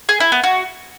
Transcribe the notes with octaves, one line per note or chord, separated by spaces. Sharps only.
G#4
E4
B3
F#4